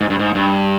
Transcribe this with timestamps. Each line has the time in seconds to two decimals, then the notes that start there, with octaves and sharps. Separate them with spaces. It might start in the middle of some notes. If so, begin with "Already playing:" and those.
0.01 G#2
0.10 G2
0.19 G#2
0.35 G2